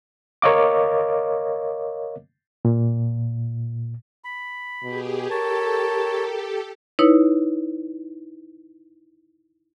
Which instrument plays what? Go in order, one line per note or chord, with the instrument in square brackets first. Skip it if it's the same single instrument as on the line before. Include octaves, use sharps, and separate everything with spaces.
[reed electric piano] A#4 C#5 D#5 F5 D6
A#2
[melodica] B5
[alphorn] B2 [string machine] G4 G#4
[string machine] G4 A4 [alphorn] A#4 [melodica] C#5 A5
[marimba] D#4 E4 B4 C#5